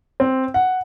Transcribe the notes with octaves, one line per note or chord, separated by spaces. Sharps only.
C4
F#5